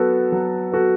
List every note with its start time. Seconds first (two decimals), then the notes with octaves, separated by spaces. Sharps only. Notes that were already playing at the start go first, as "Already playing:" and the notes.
Already playing: F#3 B3 F#4 A4
0.32 F#3
0.72 B3 F#4 A4